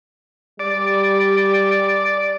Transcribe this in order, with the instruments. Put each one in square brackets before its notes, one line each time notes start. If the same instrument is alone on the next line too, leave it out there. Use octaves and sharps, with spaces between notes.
[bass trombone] G3 [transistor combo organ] D5